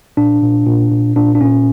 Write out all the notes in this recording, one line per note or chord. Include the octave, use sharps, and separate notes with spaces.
A#2 D4
A#2
A#2
A#2
A#2 D4
D4
A#2 C#4